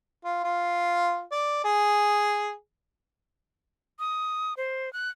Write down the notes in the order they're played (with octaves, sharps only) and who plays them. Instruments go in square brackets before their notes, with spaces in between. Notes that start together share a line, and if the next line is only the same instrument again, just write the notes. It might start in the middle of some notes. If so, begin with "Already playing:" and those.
[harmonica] F4
F4
D5
G#4
[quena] D#6
C5
F#6